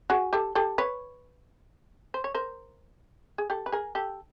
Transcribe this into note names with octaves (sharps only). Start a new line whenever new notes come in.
F#4 G#4
G4 A4
G4 A4
B4 C#5
C5
C#5
A#4 C5
G#4
G4 A4
B4
G#4 A#4
G4 A4